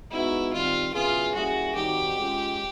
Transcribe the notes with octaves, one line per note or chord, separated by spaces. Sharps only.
G#3 B3 D#4 E4 F#4
D#3 G3 C4 F4
C#3 F#3 B3 E4 F4 G#4
G3 A#3 C#4 E4 F#4 G#4
D#3 G3 C4 D#4 F#4 G4
G#3 C#4 F4 G#4